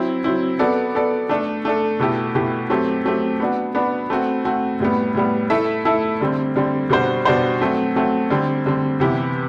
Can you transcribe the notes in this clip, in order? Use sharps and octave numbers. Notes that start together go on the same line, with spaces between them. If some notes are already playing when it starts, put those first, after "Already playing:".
Already playing: F#3 C4 E4
F#3 C4 E4
B3 F#4 A4 D5
B3 F#4 A4 D5
A3 D4 A4
A3 D4 A4
B2 A3 E4 G4
B2 A3 E4 G4
F#3 A3 C4 G4
F#3 A3 C4 G4
B3 D4 F#4
B3 D4 F#4
A3 C4 F#4
A3 C4 F#4
A2 G3 B3
A2 G3 B3
A3 E4 A4 E5
A3 E4 A4 E5
D3 G3 C4
D3 G3 C4
B2 G3 D4 F#4 C5
B2 G3 D4 F#4 C5
F#3 A3 C4 F#4
F#3 A3 C4 F#4
D3 G3 C4
D3 G3 C4
C3 E3 B3 E4 G4